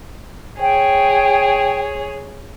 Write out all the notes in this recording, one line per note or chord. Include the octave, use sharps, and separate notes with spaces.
G#4 C#5 G5